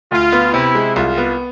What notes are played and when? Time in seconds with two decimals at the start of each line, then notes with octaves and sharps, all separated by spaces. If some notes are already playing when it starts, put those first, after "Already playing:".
0.12 D2 F4
0.32 B3
0.53 C3 E4
0.75 G#3
0.96 C2 F4
1.18 B3